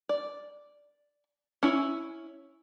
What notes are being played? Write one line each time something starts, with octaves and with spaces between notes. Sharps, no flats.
D5
C#4 E4